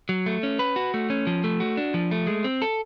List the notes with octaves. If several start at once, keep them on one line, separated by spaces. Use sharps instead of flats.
F#3
A3
C#4
B4
F#4
A3
C#4
F3
A3
F#4
D4
F3
A3
G#3
C4
A4